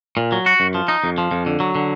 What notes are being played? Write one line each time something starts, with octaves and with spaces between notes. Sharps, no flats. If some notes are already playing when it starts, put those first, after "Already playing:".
A#2
F#3
F#4
F#2
F3
D#4
F2
F3
F2
D3
F#3
D3